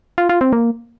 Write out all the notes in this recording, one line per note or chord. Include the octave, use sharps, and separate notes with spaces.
F4
F4
C4
A#3